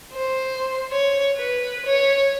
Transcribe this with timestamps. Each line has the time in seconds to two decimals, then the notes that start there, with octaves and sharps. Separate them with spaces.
0.13 C5
0.91 C#5
1.37 B4
1.86 C#5